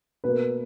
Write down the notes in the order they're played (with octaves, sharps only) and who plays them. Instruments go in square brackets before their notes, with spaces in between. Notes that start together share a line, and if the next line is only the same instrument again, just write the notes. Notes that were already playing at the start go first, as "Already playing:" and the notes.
[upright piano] B2 A#3 B4